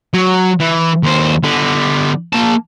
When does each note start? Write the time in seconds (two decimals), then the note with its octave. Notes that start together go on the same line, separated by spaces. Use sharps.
0.14 F#3
0.60 E3
1.03 D#2 C5
1.44 D3 B3
2.33 A#3 A5